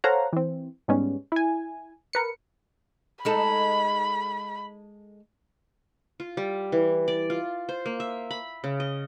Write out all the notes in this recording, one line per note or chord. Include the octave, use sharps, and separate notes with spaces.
A4 C5 C#5 F5 F#5 A#5
E3 C4
G#2 G3 G#3 B3 C#4
E4 G#5
A#4 B4 C#7
G#3 D#4 A4 B5
F4
G3
E3
D5
F4
C5
A#3
E5
B5
C#3
D#5